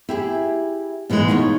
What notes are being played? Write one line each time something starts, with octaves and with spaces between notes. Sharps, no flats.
E4 G4 G#4
B2 E3 F3 G#3
D#4 F4 B4 C#5